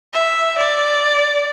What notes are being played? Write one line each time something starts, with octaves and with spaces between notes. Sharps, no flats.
E5
D5